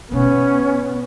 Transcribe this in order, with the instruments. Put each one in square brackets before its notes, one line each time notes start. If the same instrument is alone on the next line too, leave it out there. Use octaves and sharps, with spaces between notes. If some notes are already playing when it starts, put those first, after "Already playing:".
[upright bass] B2 D#4 [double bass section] B3 [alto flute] C#4